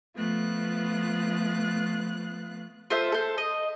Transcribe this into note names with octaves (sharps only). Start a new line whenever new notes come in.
F3 A3 B3 F4 F#6
F4 A4 C5 E5
A4 C5
D#5